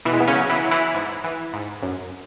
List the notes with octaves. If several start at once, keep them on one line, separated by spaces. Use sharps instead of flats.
B2 E3 E4
G#3
B3
C#3 C#4
F#3
E3 E4
F#3
E3 E4
G#2
E3
G#2
F#2